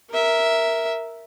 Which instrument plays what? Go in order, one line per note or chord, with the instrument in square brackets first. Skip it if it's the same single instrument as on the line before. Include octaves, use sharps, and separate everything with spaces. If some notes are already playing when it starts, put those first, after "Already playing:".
[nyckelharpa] A#4 E5